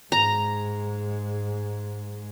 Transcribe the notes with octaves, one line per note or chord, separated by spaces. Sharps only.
G#2 G#3 A#5